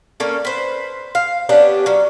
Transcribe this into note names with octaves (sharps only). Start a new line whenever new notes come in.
A#3 C#4 A4 D5
B4 C5
F5
B3 C#4 D4 G4
F#3 C#4